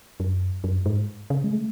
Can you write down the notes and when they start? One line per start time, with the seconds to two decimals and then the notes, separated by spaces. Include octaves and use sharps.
0.20 F#2
0.64 F#2
0.86 G#2
1.30 C#3
1.44 G#3
1.52 A3